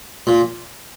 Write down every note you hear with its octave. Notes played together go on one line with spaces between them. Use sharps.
A#2